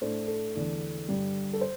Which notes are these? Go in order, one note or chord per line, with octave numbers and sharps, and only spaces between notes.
A2 A3 D4 C5
A4
E2 D3 A3 D4
G2 D3 G3
A4
C5